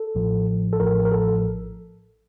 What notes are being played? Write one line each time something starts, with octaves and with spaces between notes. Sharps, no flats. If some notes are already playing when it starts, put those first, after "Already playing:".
Already playing: A4
A1 A2 F3
A4
A1 A2 F3 A#4
A#4
A4